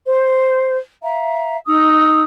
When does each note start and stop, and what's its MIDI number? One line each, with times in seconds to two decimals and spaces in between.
0.06 0.77 72
1.02 1.57 76
1.02 1.57 77
1.02 1.57 82
1.66 2.22 63
1.66 2.22 87
1.66 2.22 88